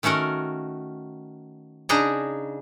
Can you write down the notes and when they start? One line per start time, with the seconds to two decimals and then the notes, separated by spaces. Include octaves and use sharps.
0.03 D#3 A3 C#4 F#4 A#4
1.89 C#3 D4 D#4 G#4 D#5 A#5